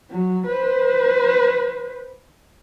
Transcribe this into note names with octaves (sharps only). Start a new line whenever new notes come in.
F#3
B4 C5